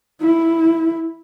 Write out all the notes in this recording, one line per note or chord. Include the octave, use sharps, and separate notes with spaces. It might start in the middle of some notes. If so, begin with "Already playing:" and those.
E4